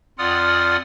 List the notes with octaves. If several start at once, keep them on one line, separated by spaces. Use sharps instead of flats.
F2 F4 D5 F#5 D#6 F6